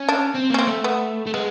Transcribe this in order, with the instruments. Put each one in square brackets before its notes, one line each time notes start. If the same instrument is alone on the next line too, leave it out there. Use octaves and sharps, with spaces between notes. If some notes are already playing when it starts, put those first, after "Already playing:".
Already playing: [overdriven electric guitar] C#4
[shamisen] D4
[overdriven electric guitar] C4
[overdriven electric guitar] A#3 [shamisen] C#4
[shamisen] C4
[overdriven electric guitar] A3
[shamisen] B3
[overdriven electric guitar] A3
[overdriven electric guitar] G#3 [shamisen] B3